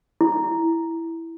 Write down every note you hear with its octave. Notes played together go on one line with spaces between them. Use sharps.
E4